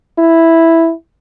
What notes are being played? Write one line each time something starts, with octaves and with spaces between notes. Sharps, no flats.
E4